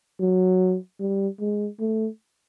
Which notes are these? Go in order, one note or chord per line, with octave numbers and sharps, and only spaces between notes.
F#3
G3
G#3
A3